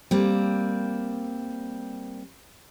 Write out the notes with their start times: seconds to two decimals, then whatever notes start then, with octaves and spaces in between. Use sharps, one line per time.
0.11 G3 A#3 C4